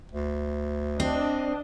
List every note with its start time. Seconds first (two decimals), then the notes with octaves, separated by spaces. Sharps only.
0.12 D2
1.00 C4 D4 D#5